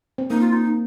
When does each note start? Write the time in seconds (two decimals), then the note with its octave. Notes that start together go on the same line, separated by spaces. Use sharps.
0.18 C4
0.30 A#3 D#4
0.41 F4
0.53 D#4